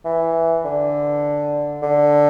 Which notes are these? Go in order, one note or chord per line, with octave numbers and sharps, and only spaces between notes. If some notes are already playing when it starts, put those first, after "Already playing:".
E3
D3
D3